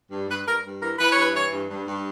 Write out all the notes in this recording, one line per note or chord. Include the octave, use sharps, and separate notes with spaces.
G2
G2 B4
G2 A#4
G2
E3 A#4
E3 B4
C#5
G2
B4
E3 C#5
G2
G2
G2